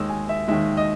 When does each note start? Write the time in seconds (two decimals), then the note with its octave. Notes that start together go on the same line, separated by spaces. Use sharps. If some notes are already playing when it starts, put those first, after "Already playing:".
Already playing: D#2 D#3 G#3 E6
0.09 G#5
0.29 E5
0.48 D#2 D#3 G#3 E5
0.77 D#5